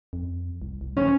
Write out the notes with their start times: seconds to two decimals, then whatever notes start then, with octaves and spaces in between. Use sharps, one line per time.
0.13 F2
0.62 C2
0.81 C2
0.97 D3 C#4